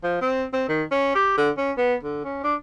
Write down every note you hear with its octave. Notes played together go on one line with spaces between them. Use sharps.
F3
C4
C4
D#3
C#4
G4
D3
C#4
B3
D3
C#4
D4